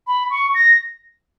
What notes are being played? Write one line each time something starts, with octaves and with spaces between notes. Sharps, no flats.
B5
C#6
A#6